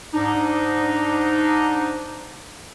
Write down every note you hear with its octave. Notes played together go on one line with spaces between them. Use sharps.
G#2 D4 D#4